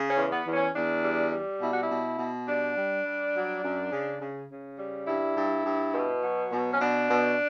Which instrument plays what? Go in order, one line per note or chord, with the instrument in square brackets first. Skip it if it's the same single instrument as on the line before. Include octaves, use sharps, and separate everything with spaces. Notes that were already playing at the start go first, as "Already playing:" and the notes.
Already playing: [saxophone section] C#3
C#4
E2
B3
E2
C#4
E2 D4
G3
G3
B2 E4
F#4
E4
B2
B2
G3 D4
G3
G3
F#3
F#2
C#3
C#3
C#3
G3
G2 E4
G2
G2
B2
F#3
B2
C#4
B2 D4
B2